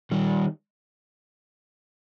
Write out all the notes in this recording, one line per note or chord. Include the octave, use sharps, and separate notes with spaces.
D#3 G3